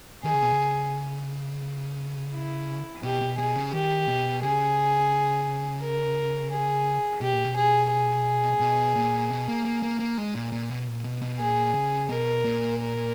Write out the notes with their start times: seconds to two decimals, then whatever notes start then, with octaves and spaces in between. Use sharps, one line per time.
0.24 D#3 G#4
0.33 C#3
0.42 B2
0.52 C#3
2.33 E4
3.03 B2 G4
3.21 B2
3.38 B2 G#4
3.55 C#3
3.73 D#3 G4
4.08 B2
4.42 C#3 G#4
5.82 A#4
6.51 G#4
7.21 B2 G4
7.33 A#2
7.45 B2
7.56 G#4
7.91 G#4
8.60 B2
8.95 A#2
9.30 B2
9.48 A#3
9.65 A#3
9.82 A#3
9.99 A#3
10.18 G#3
10.35 A#2
10.52 A#2
10.70 B2
10.87 A#2
11.04 B2
11.22 B2
11.39 A#2 G#4
11.74 C#3
12.09 B2 A#4
12.44 A#2
12.79 A#4